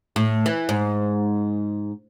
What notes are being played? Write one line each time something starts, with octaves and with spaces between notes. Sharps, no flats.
A2
E3
G#2